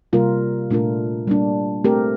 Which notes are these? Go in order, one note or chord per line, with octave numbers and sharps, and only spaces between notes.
C3 G3 A#3 F4 A#4
A#2 A3 D4 F4 A#4
G3 A#3 D4
A3 C4 G4 A#4